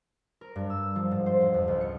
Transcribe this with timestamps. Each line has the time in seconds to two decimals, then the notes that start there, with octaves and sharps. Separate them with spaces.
0.41 A#4
0.56 G2
0.70 E6
0.96 F3
1.11 G#2
1.26 C5
1.41 E1
1.54 F2
1.68 C#2
1.81 C#7